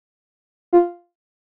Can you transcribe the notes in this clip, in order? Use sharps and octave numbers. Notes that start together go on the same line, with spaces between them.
F4